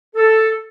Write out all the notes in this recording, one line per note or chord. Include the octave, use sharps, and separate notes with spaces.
A4